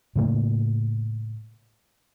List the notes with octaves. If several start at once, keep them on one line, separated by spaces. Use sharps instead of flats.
A2 C#3 A3 A#3